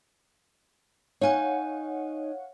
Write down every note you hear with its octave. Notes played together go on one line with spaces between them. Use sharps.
D#4 C#5 F5 F#5 G#5